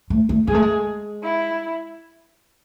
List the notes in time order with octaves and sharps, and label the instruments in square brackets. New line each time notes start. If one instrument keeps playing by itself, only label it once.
[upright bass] A3
A3
[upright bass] G#3 [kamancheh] G#4
[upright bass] A3
G#3
[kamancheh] E4